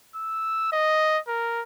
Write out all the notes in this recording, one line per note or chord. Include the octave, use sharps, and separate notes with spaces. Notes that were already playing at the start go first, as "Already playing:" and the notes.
E6
D#5
A#4